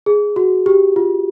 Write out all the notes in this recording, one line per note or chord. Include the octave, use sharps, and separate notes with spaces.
G#4
F#4
G4
F4